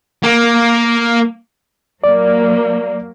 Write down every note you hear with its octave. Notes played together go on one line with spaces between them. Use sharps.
A#3
F#3 A#3 D5